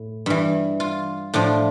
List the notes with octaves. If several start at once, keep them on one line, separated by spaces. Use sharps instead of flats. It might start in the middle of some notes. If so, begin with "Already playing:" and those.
Already playing: A2
G2 E3
F4
A2 F3 D4